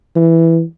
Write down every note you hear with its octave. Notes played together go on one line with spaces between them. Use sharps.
E3